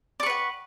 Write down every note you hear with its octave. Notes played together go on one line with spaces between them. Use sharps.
B4 D5 F#5 C#6